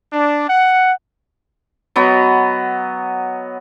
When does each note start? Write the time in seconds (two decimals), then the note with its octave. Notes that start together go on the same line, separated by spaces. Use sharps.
0.13 D4
0.48 F#5
1.96 F#3 B3 D#5